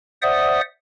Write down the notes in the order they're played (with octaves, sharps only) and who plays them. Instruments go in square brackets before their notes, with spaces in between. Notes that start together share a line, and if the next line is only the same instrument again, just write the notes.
[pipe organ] C5 D5 E5 F#5 D#6